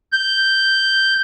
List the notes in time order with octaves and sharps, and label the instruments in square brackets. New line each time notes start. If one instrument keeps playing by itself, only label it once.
[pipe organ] G6